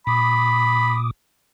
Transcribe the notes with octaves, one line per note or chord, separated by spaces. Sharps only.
A#2 B5 D6 D#6